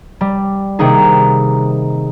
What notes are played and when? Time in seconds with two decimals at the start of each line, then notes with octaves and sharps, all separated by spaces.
0.21 G3
0.79 C3 D#3 A#3 D#4 G#4